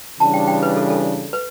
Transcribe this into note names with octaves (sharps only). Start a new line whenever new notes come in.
C#3 E3 G3 D4 A5
G5
G5
B4
A4
A4
B4